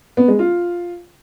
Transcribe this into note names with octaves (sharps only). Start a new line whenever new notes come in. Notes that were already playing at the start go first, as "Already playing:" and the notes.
B3
G#3
F4